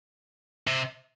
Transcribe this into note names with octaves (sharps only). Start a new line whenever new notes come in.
C3